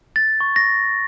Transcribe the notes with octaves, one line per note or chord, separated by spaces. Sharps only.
A6
C#6
A#6